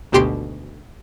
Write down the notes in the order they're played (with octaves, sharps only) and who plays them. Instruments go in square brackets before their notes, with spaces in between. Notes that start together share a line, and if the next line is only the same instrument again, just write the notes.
[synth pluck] G#1 D2 B2 G4 C6 D7